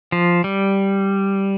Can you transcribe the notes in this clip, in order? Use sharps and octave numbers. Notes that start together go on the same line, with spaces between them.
F3
G3